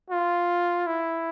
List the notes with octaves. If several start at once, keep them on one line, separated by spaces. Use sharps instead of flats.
F4
E4